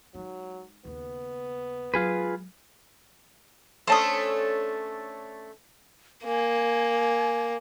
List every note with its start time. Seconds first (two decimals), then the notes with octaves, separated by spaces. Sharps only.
0.15 F#3 G#3 D#4
0.85 D#2 C#3 B3
1.94 F#3 G#3 F4 G#4 B4
3.87 A3 C#4 D4 C5 A5 D#6
6.25 A#3 G#5